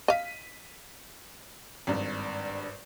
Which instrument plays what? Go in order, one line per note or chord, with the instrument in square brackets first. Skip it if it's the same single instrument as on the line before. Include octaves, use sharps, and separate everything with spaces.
[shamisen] D#5 F5 [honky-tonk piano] B6 D#7
[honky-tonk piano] G#1 G2